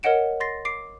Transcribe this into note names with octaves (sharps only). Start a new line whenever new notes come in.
A#4 C#5 D#5 F#5 D7 E7
C6 A6 A#6 C7
D6 C7 D7